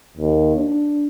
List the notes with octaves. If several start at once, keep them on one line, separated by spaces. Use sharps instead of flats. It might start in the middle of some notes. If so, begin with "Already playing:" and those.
D#2
D4